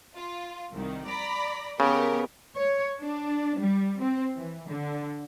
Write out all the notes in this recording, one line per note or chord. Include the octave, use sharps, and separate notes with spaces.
F4
C2 D#3
D5 A#5 B5
C#3 B3 G4 A#4
C#5
D4
G3
C4
E3
D3